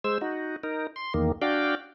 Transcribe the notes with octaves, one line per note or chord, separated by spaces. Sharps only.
G#3 C5 E6
D#4 F#4
D#4 A#4
C6
E2 D#3 A#3
D4 F#4 D5 F5 G5